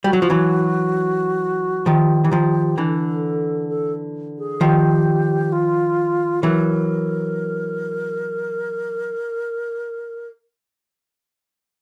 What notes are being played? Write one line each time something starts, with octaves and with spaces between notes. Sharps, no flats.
G3 F#4
F#3
F3
E3 F#3
D#3 F3 G4
E3
D#3 F3
D3 E3 A4
A4
G#4
D#3 F3 G4
F4
E3 F#3 A#4